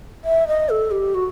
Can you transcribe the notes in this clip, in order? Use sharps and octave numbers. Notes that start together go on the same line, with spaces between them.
E5
D#5
A4
G4
F#4